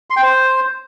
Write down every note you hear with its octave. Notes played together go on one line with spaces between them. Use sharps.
C6
G5
C5